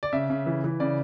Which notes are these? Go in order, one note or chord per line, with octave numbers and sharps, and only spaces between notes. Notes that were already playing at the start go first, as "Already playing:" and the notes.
D5
C#3 E5
C#3
E3
E3
C#3 D5